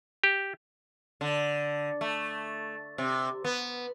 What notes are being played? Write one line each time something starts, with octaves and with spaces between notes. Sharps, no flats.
G4
D3
A3
C3
B3